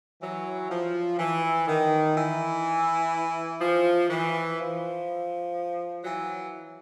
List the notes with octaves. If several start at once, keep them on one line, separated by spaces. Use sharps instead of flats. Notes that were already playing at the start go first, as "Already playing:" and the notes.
E3 F#3
F3
E3
D#3
E3
F3
E3
F3
E3 F#3